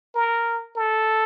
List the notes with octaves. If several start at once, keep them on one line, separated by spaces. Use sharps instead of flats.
A#4
A4